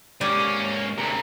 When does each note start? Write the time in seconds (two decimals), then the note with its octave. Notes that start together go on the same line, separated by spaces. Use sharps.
0.21 G#2 A#3 C#4 G4 D5 G#5
0.98 D2 C3 G#4 A#4